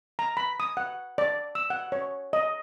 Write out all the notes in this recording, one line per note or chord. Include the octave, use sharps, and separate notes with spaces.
A#5
B5
D#6
F#5
D5
E6
F#5
C#5
D#5